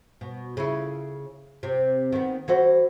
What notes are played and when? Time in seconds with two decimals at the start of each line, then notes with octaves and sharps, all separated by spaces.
0.21 B2
0.57 C#3 E4
1.63 C3
2.12 D#3 B3
2.48 E3 F#4 C5